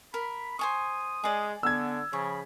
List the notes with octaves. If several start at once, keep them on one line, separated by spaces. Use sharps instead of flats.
A#4 B5
C5 G#5 C#6 D#6
G#3 G#4 D5
D3 B3 E6 G#6
C#3 F3 B5 C#6